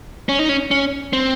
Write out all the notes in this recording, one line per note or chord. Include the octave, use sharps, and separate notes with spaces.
C#4
D#4
C#4
C#4
C4